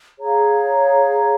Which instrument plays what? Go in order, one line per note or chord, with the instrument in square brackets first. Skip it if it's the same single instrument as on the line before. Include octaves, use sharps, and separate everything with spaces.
[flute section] G#4 C#5 F5 A#5